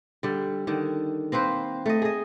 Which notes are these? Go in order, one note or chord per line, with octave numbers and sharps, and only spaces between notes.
D3 G3
D3 D#3
A#3 C4 B4 C5
A3 D#5
G#4 D#5